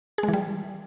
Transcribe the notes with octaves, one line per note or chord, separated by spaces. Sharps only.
G#4
G#3
E3
G3